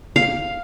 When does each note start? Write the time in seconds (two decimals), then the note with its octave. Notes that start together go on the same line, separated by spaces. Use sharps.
0.16 F5